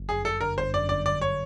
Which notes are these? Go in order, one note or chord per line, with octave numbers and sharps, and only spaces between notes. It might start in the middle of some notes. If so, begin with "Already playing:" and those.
Already playing: G1
F#2 G#4
G1 A4
D3 A#4
G1 C5
F#2 D5
G1 D5
D3 D5
C#5